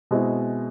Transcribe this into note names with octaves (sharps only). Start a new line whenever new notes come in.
B2 G#3 C4 E4